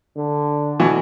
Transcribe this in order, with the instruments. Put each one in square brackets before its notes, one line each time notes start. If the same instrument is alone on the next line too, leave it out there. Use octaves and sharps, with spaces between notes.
[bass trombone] D3
[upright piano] B2 E3